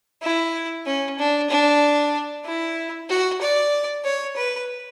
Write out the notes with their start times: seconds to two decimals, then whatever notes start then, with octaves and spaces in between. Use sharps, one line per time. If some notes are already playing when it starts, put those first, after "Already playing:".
0.22 E4
0.86 C#4
1.19 D4
1.50 D4
2.45 E4
3.09 F#4
3.41 D5
4.04 C#5
4.36 B4